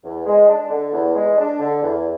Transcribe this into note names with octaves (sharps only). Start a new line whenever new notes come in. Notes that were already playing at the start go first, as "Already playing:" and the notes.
E2
G#3
D4
D3
E2
G#3
D4
D3
E2